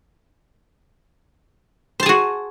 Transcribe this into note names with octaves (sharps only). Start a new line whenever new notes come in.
F#4 G#4 C5 A5